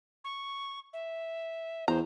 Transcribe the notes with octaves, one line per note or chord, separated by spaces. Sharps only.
C#6
E5
E2 C5 A#5